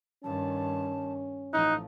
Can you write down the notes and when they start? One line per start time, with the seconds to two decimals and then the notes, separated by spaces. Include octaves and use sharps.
0.24 G2 D#3 C#4 A5
1.53 A1 F3 D#4 F#6